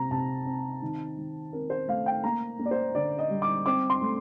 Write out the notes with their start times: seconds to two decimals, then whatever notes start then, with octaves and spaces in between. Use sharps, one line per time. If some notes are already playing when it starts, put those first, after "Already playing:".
Already playing: C3 C4 A#5
0.11 C3 A5
0.46 C4
0.82 D#3
1.17 D#3
1.53 C4 A#4
1.70 C5
1.88 A3 F5
2.06 G5
2.24 A#3 A#5
2.59 A#3
2.66 D5
2.71 C5
2.94 D3 D5
3.19 D#5
3.30 G3
3.42 D6
3.66 C4 D6
3.90 C6
4.01 A3